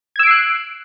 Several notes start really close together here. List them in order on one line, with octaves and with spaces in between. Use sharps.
G#6 E6 D7 C7 F#6